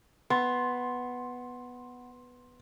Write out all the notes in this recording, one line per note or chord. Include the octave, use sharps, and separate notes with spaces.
B3 C6